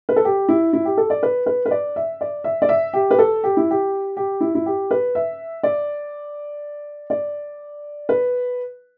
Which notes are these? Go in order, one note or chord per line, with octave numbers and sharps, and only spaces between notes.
B4
A4
G4
E4
E4
G4
A4
D5
B4
B4
B4
D5
E5
D5
E5
D5
E5
G4
B4
A4
G4
E4
G4
G4
E4
E4
G4
B4
E5
D5
D5
B4